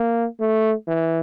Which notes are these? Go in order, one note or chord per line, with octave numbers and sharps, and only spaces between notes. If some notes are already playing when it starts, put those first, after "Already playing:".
Already playing: A#3
A3
E3